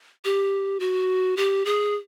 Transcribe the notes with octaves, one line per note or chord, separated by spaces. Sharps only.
G4
F#4
G4
G#4